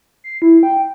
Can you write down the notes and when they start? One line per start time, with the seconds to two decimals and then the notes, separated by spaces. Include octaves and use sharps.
0.24 C7
0.42 E4
0.63 G5